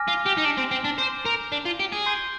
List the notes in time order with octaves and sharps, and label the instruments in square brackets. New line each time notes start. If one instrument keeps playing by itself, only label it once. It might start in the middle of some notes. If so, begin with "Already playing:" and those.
Already playing: [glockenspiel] G#5 D6 F6 A#6
[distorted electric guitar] F4
G4
D#4
D4
C4
C4
D4
[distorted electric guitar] C5 [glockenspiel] D6 G6 C7 G7
[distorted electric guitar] A#4
D4
F4
G4
G#4
[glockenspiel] C6 G6 C7 G7